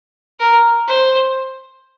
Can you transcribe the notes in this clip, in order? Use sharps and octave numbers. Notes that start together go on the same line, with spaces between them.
A#4
C5